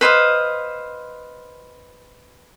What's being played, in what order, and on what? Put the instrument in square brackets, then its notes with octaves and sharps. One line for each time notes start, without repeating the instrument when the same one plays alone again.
[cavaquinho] B4 C5 D#5 F5